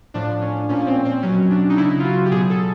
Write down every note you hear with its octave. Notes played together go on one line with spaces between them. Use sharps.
A2 F3 D4
C#4
A#2 F3 C#4
C4
C4
B2 F#3 C#4
D4
D#4
C#3 F#3 E4
F4
F#4
G4
B2 F#3 G#4
A4